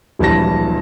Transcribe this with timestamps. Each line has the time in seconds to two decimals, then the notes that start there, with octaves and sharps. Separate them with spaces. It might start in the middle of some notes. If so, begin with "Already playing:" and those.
0.19 D1 A#1 E3 G3 A5 A#6